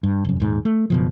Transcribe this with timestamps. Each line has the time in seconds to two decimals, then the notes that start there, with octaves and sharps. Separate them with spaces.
0.03 G2
0.25 F1 F#2
0.40 D#1 G#2
0.65 A3
0.90 F#1 B2 F3